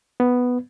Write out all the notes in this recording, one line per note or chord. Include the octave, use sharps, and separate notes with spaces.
B3